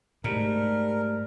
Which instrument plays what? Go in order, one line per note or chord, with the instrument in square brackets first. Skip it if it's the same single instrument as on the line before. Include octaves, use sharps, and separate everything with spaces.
[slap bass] G#2 [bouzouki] G3 [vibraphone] A3 G4 [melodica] A#4